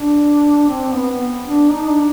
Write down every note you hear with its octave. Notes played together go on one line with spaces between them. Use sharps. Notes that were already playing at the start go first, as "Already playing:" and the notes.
Already playing: D4
C4
B3
D4
D#4
D4